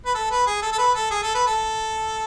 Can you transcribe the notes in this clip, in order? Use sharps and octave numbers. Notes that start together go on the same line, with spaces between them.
B4
A4
B4
G#4
A4
A4
B4
A4
G#4
A4
B4
A4